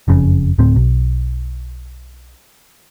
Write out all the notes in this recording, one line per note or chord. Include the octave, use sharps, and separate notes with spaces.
F#1 F2 C#3
D1 A2 C4
B1